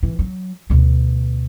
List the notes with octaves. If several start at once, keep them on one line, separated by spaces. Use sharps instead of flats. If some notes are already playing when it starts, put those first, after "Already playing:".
E3
F#3
D2 B2